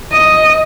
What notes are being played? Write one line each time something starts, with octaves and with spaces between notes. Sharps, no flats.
D#5